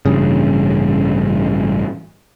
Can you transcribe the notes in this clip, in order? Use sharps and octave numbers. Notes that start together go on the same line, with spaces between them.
A1 G2 C#3